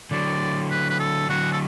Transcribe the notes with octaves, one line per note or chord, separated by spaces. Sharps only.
D3 F#3 D5
B4
B4
A4
D3 F#3 F#4
A4